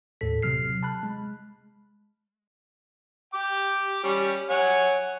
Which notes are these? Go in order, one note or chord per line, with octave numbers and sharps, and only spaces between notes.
D#2 A2 A4 B6
C3 F#3 F6 C7
A5 B5 F#6
G#3
G5 D6
G3 C#4
C#5 F#5 G#5